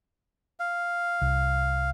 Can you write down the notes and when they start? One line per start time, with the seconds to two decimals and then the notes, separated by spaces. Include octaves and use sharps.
0.60 F5
1.21 C2